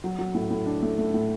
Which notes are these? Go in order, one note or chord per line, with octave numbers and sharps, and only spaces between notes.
F#3
F#3
A2
A2
D4
A3
A3
A2